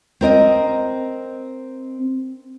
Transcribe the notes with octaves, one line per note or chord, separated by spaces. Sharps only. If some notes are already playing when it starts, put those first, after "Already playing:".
C4 A#4 D#5